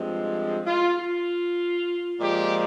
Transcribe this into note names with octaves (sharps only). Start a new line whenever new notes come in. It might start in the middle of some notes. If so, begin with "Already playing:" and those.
Already playing: G2 F3 G#3 C4
F4
F4
A#2 F3 G#3 G4